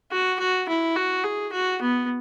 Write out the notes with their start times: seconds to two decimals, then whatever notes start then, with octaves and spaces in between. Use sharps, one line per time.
0.11 F#4
0.39 F#4
0.68 E4
0.96 F#4
1.24 G#4
1.52 F#4
1.82 B3